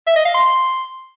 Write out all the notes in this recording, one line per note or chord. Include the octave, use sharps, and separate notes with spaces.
E5
D#5
F5
C6